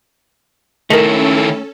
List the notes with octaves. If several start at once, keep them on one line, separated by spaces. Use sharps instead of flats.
D#3 A3 C#4 E4 A4 A#4 D#5